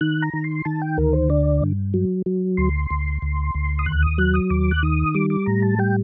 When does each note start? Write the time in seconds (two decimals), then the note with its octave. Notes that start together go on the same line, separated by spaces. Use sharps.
0.01 D#3 F#6
0.22 A#5
0.33 D#3
0.44 C6
0.65 D#3 A5
0.82 G5
0.98 D2 A#4
1.13 C5
1.30 D3 D5
1.62 G2
1.94 F#3
2.26 F#3
2.57 D2 C6
2.91 D2
3.22 D2
3.55 D2
3.79 D#6
3.86 D#2 F#6
4.02 D#6
4.18 F#3 F#6
4.34 D#6
4.50 D#2 D6
4.71 F#6
4.83 D#3 D#6
5.14 G3 D6
5.30 D6
5.46 A2 A#5
5.62 A5
5.79 G3 G5